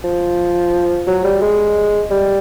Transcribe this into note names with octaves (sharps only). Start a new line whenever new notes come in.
F3
F#3
G3
G#3
G3